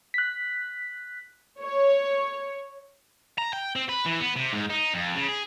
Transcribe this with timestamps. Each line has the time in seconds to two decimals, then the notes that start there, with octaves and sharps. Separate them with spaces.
0.14 F#6 B6
1.61 C#5
3.38 A#5
3.53 G5
3.76 C4
3.89 B4
4.06 E3
4.20 B3
4.36 C3
4.53 G#2
4.70 D#4
4.94 F2
5.15 C#3
5.29 G#4